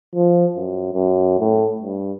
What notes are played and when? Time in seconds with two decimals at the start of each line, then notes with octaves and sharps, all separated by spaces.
0.15 F3
0.55 F#2
0.93 F#2
1.39 A2
1.82 G2